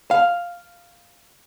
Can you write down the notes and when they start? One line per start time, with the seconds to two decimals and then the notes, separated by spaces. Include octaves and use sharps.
0.11 F5